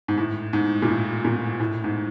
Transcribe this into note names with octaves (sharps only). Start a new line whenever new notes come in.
G#2
A2
G#2
A#2
A2
A#2
A2
G#2